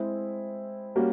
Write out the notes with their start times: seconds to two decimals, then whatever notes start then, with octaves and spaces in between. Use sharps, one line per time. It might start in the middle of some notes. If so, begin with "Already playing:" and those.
Already playing: G#3 C4 E4
0.96 G3 A#3 C#4 F#4